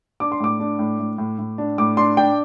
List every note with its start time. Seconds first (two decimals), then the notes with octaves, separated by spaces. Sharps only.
0.20 D4 D6
0.32 C6
0.40 A2 D6
0.60 D4
0.79 A2
0.99 A2
1.18 A2
1.38 A2
1.58 D4
1.78 A2 D6
1.97 D4 C6
2.17 D4 G5